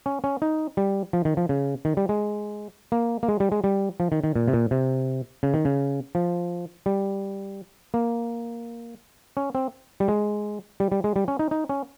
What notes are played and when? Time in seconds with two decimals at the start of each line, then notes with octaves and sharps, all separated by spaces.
0.06 C#4
0.24 C#4
0.42 D#4
0.77 G3
1.13 F3
1.25 D#3
1.37 F3
1.49 C#3
1.85 D#3
1.97 G3
2.09 G#3
2.92 A#3
3.23 A#3
3.28 G#3
3.40 G3
3.52 G#3
3.64 G3
4.00 F3
4.12 D#3
4.24 D#3
4.36 A#2
4.48 C3
4.53 A#2
4.71 C3
5.43 C#3
5.54 D#3
5.65 C#3
6.15 F3
6.86 G3
7.94 A#3
9.37 C#4
9.55 C4
10.00 G3
10.08 G#3
10.80 G3
10.92 G3
11.04 G#3
11.16 G3
11.28 C#4
11.39 D#4
11.51 D#4
11.69 C#4